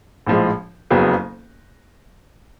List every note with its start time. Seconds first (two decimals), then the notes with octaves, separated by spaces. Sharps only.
0.27 A#1 A2 F3 G#3
0.90 F#1 F2 C#3 F#3 B3